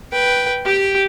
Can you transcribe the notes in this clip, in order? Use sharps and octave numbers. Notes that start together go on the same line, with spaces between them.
B4 G5
G4 G5